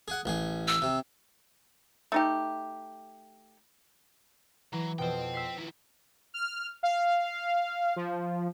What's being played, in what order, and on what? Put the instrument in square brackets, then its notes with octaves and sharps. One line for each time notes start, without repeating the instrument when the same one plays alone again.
[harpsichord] G#4 F#5
A1 G#4
[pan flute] E6
[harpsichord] C3
[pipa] A3 D#4 G4
[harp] E3 [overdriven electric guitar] F#3
[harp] F2 B2 [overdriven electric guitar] C5 G5
[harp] E6 B6 C7
[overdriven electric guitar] D#3 E4
[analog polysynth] F6
F5
F3